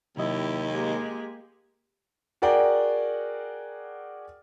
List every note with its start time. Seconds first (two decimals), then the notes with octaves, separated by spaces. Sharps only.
0.17 D#2 C3 F#3 E4 G4 D#5
0.69 G#3 A#3 G4 G#5
2.42 F#4 G#4 A#4 D5 F#5 G5